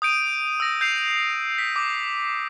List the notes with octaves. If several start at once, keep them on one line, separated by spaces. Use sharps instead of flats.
D#6 G6 D7 D#7
E6 A#6
G6 C7 F7
B6
D6